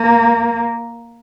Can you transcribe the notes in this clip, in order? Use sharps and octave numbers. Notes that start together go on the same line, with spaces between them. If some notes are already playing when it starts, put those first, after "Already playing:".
Already playing: A#3